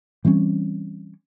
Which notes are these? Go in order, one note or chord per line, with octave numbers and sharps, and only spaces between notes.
E3 G3 C4 C#4